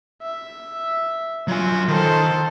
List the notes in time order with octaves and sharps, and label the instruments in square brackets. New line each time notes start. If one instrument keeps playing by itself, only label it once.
[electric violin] E5
[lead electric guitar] F#3 G#5 [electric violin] F4
[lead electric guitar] D#3 [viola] A4 C5